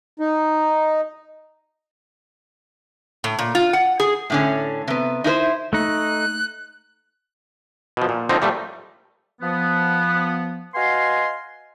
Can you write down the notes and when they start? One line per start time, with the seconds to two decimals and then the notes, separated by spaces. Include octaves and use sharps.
0.20 D#4
3.24 A2
3.39 A#2
3.55 F4
3.73 F#5
4.00 G#4
4.30 A2 D3 C#4
4.88 C3 B3
5.24 D#4 E4 A#4 C5
5.73 A3 D#4 F#6
7.97 B2 F3
8.09 A#2
8.29 D3 F3 C4 D#4
8.42 A#2 G3 A3
9.41 F3 B3
10.75 F#4 B4 D#5 F5 G#5 C6